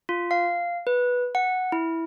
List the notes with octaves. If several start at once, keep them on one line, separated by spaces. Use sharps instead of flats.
F4
F5
B4
F#5
E4